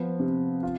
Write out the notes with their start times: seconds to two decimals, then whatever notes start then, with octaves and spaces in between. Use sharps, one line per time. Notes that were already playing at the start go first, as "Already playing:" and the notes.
Already playing: F3 B3
0.20 C3
0.63 F4